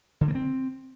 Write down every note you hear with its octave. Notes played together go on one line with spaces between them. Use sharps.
D3
A#3
C4